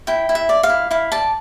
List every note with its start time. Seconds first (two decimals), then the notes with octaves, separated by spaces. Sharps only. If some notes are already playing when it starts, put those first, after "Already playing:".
0.07 E4 G5
0.29 E4
0.35 E5
0.49 D5
0.63 F5
0.70 E4
0.91 E4 F5
1.12 D5 A5